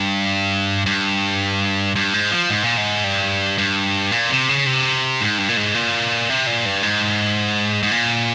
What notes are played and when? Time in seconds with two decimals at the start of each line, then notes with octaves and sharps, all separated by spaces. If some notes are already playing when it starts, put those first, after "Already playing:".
Already playing: G2
0.86 G2
1.96 G2
2.14 G#2
2.32 F3
2.50 G#2
2.63 A#2
2.77 G#2
3.04 G2
3.58 G2
4.12 A#2
4.30 C3
4.49 C#3
4.66 C3
5.21 G#2
5.38 G2
5.49 A#2
5.57 G#2
5.75 A#2
6.29 C3
6.47 A#2
6.66 G2
6.83 G#2
7.83 G#2
7.91 A#2